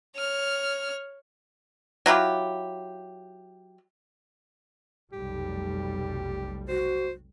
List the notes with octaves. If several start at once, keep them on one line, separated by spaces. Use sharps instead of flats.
C#5 F6
F#3 E4 F4 G4
F1 B1 G3 G4
F#4 C5